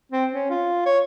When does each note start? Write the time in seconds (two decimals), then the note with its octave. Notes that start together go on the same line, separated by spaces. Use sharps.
0.12 C4
0.33 C#4
0.50 F4
0.86 C#5